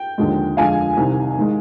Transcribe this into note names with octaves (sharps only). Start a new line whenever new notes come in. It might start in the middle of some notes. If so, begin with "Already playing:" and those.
Already playing: G5
D#2 D3 F3 G#3
F2 D3 F3 G#3 F5 G#5
C2 C3 D#3
D#3 G#3